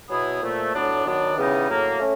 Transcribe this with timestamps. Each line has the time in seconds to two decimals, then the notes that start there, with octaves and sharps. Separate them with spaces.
0.09 B2 F#3 B3 E4 G#4
0.41 A#2 F3 A3
0.73 A2 F#3 B3 D4
1.05 D#3 F#3 B3 D4
1.36 C#3 E3 G3 B3 D#4
1.68 A2 F#3 A#3
1.99 A3 C#4